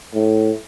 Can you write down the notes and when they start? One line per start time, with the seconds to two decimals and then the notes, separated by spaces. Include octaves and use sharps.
0.14 A2